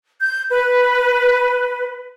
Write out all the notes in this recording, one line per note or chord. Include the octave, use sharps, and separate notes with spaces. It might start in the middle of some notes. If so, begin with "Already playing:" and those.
G6
B4